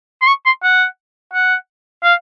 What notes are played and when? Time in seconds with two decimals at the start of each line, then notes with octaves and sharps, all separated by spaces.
0.22 C6
0.27 C#6
0.46 C6
0.63 F#5
1.34 F#5
2.03 F5